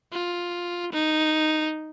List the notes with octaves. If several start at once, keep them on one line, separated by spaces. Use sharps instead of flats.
F4
D#4